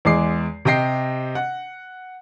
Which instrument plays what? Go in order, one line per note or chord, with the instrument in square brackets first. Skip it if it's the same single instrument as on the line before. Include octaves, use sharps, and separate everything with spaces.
[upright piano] E2 G#3 D6 C7
C3 G4 D#5 G5 A#6 C7
F#5